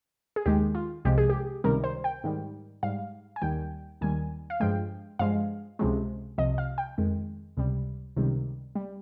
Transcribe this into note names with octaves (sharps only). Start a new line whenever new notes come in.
G#4
D#2 D#3 G#3 G4
F4
C2 C3 F3 G#3 G4
G#4
G4
C#2 C3 D#3 G3 A#4
C5
G5
G#2 D#3 G3
G#2 G3 F5
G#5
D#2 D#3 G3 G5
D#2 D#3 G3 G#5
F5
G2 F3 G#3 G5
G2 F3 G#3 F5
C#2 C3 F3 G#3
C2 C3 F3 D#5
F5
G5
F2 D#3 G#3
C#2 C3 G3
C#2 C3 D#3 G3
G3